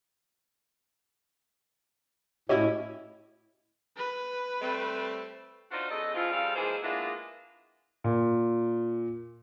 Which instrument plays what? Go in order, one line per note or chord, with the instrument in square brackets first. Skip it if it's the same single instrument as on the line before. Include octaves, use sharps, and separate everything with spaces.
[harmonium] A2 [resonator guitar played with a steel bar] C#4 E4 D#5 [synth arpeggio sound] F#4 G4 C#5
[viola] B4
[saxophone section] G3 A3 C4
D4 D#4 F4 F#4 C5 D5
E2 C#3 A4 D#5
C#3 F3 C4 E4 F4
C#3 F3 G3 A4 F5
E3 F3 G#3 A#3 G#4 C5
G#3 A#3 B3 D4 E4 F4
[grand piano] A#2